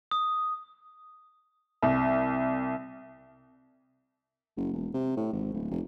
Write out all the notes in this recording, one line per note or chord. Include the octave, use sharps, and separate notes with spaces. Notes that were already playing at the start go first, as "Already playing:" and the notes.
D#6
C2
F#1
E1
C3
A2
G#1
D1
F1